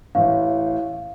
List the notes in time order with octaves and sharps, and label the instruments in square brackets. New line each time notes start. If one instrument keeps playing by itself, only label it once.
[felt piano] A1 A2 [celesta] F5